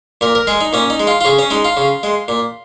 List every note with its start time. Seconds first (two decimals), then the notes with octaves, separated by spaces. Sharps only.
0.21 A#2 A#4
0.35 A#4
0.47 G#3 G#4
0.61 D#4
0.73 A#2 C#4
0.90 D#4
1.00 G#3
1.07 F4
1.21 F4
1.25 C#3 G#4
1.39 C#4
1.50 G#3 D#4
1.65 F4
1.77 C#3
2.03 G#3
2.28 A#2